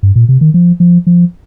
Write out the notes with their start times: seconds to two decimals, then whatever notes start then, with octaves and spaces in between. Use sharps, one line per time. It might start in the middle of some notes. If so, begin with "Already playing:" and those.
0.03 G2
0.16 A#2
0.29 C3
0.41 D#3
0.54 F3
0.80 F3
1.07 F3